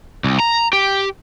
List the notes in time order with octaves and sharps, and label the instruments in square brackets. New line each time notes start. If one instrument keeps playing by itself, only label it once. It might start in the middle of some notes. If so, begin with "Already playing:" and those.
[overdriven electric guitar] C2
A#5
G4